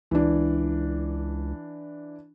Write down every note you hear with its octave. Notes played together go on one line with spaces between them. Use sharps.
C#2 E3 D4